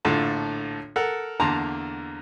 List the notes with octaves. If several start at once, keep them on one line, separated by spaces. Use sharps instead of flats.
A#1 A2 D3 F4 A4 A5
A4 A#4 F#5
E2 D3 A#3 A5 A#5 C6